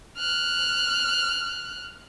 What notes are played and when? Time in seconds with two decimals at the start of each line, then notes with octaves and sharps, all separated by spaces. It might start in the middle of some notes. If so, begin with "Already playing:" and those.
0.17 F6 F#6